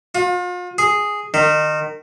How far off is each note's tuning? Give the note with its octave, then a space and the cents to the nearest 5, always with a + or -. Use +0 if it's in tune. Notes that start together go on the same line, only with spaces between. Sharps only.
F4 +40
G#4 +0
D#3 -25